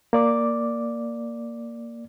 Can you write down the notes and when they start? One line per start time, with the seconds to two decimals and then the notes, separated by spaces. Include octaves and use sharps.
0.13 A#3 D5 D6